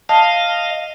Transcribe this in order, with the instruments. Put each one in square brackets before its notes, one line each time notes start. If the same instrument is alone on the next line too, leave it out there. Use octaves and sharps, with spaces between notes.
[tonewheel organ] D#5 F5 [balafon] A5